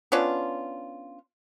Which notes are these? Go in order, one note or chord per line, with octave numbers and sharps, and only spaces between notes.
B3 C#4 D4 F4